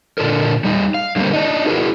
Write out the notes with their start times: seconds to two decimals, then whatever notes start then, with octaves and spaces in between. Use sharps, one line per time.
0.18 A#2 D3 D4 F4 A4 A#4
0.64 G3 D#4
0.94 F5
1.16 D3 G3 A3 A#3 C4
1.33 D4 D#4
1.66 E4 F#4 G#4 A#4 B4